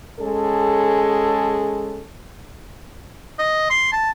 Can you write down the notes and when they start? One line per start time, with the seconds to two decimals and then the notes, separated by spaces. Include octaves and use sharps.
0.20 G#3 C#4 G#4 A4
3.39 D#5
3.70 C6
3.92 A5